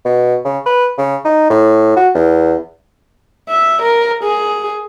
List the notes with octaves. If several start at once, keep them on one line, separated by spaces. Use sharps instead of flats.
B2
C#3
B4
C#3
D#4
A2
F#4
E2
E5
A#4
G#4